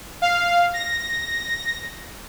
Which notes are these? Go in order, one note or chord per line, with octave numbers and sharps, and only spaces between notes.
F5
A#6